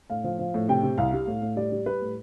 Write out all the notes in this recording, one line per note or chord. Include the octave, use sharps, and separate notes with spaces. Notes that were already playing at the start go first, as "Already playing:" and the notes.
A2 F5
F3
F3
A2
C3 G5
C3
C2 F5
G3
A2
A2
G3 D5
G3
G3 B4
A2